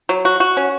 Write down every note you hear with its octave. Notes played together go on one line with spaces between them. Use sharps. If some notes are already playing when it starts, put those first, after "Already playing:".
F#3
F#4
F#4
C#4